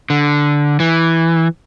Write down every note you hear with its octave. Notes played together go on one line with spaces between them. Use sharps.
D3
E3